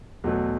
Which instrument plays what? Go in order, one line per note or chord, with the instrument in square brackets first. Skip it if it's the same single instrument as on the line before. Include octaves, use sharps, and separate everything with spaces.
[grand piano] E2 B2 F#3 A3